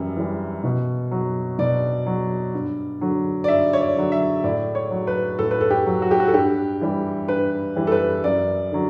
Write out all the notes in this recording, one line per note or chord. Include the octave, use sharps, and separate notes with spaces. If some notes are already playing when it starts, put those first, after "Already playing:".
Already playing: F#2 E3 G3
E3 G3
B2
F#3
B2 D5
F#3
G2
D3 F#3
D5
G2 E5
C#5
D5
D3 F#3
E5
A2 D5
C#5
F#3
B4
A2 A4
B4
A4
G4
F#3
F#4
G4
F#4
A4
G2 G4
E3 G3
G2 B4
E3 G3
A4
B4
F#2 D5
D3 F#3